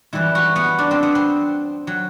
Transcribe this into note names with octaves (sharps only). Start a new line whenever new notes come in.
F#2 E3 G3 E4
F#4
B3
D4
C4
B3
C4
F#3